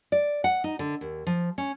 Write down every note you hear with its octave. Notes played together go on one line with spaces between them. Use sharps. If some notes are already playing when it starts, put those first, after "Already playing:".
D5
F#5
D#4
D3
D#2
F3
C#4